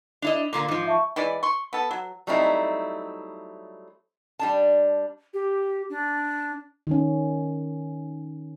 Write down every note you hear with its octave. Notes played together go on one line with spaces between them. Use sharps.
D4 E4 D#5 F7
A#2 D3 A#3 D6
G#2 F3
E5 A5 C#6
E3 G#3 E4 D5
C6 C#6
B3 A4
F#3
F#3 G3 A3 C4 D#4 E4
G3 D4 A5
G4
D4
D#3 C#4